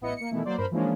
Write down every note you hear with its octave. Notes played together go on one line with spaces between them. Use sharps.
A1 B3 E4 D#5 C#7
A#3 C#7
B2 D#3 E3 A3 E4
F#3 A#3 C5 D5
G2 A#4 C5 B5
E3 F3 G#3 A#3 C#4 D4